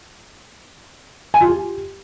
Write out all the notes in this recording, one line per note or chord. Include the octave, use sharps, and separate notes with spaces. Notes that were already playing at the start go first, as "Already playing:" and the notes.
G#5
F4
G4